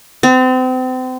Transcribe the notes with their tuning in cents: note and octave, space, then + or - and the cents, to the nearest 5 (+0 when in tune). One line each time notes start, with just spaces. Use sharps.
C4 -35